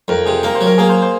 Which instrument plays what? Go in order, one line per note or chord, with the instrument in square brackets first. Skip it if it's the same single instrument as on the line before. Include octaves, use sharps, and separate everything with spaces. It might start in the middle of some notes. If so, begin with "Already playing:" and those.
[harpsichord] F2 [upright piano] A#4
[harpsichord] C3 [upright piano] G#4
[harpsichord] A#3 [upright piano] A#4
[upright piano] C5
[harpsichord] F#3
[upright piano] A#4
[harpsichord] A#3 [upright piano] G#4
[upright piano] C5
C5